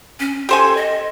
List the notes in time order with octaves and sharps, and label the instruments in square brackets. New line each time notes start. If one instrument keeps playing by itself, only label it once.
[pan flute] C#4
[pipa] G4 C5 G#5 [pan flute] A4
[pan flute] D#5